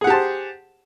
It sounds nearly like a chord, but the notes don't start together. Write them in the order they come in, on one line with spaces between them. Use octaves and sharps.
G#4 F#5 G4 A5 C5